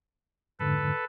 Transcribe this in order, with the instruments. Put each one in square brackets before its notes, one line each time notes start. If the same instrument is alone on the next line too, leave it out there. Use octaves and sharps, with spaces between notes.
[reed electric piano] F2 G#2 D3 [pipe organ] A4 B4